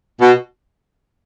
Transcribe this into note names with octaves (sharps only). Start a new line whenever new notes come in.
B2